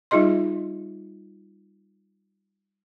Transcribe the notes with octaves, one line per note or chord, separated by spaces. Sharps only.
G3 D#4 F4 G#4 D#5 C6